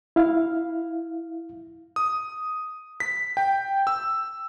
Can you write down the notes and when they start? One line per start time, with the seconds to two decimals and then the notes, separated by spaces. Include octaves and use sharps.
0.16 E4 F5
1.96 D#6
3.00 B6
3.37 G5
3.87 E6